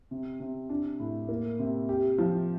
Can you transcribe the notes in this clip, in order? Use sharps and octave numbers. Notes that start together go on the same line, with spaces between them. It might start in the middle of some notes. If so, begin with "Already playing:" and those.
C3
C3
D4
A2
A#3
C3
G4
F3